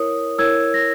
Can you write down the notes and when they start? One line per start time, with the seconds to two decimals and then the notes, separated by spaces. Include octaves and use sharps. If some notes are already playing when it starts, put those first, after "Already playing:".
Already playing: E4 A#4 C#5 D#6
0.38 E4 A#4 C#5 E6 G#6
0.74 A#6